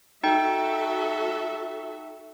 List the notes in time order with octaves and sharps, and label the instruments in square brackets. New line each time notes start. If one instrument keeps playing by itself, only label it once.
[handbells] D#4 G5 [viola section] F#4 A4 E5